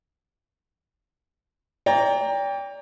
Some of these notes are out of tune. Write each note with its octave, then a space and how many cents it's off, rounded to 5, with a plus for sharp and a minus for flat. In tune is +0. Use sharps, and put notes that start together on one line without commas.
D5 -35 G5 +25 A#5 +0